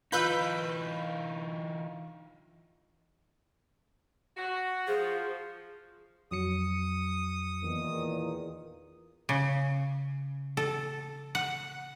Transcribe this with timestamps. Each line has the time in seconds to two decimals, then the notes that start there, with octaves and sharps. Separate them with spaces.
0.12 E3 D#4 F4 B4 B5 E6 G6
4.37 F#4
4.88 F3 G#4
6.31 F2 F#3 D#6 C#7
7.63 E2 A#2 D#3
9.29 C#3
10.57 A4
11.35 F#5